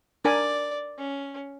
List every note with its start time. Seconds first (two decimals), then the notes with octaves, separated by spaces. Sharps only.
0.25 D4 A#4 D5 G#5
0.98 C#4